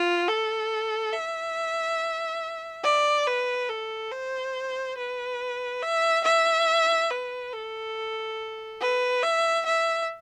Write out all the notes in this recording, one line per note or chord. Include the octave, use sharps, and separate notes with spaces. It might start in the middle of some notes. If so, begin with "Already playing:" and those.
Already playing: F4
A4
E5
D5
B4
A4
C5
B4
E5
E5
B4
A4
B4
E5
E5